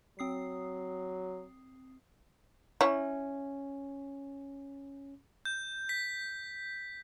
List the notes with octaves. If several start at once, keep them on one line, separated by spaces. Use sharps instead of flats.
F#3 C4 D#6 C7
C#4 E4 C#5
G6
B6